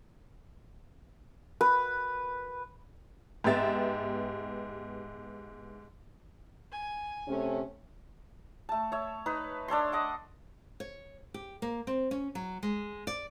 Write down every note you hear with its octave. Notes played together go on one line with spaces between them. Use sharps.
B4
G#2 B3 G4 E5 A6
G#5
C3 A3 C#4
A3 A5
C#5 E5
D#4 B4
D4 A4 C#5 C6
D#5 F#5 D6
C#5
G4
A#3
C4
C#4
F#3
G#3
D5